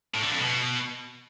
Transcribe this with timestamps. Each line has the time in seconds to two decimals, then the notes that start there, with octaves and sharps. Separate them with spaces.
0.15 A2
0.23 D3
0.32 F2
0.41 B2